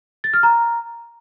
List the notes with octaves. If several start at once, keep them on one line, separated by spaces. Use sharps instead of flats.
A6
F6
A#5